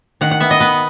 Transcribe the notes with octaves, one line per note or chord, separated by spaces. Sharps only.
D#3 F#5
F#5
B3 E5
D#5
B3 B4